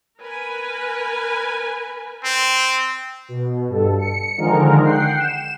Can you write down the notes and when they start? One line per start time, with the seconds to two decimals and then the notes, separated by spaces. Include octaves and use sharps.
0.19 A#4 B4 G#5
2.24 C4
3.28 B2
3.68 G2 A4
3.99 C#7
4.37 D3 D#3 F3 G#3 A#4
4.83 F#5 G5 C7
5.19 E7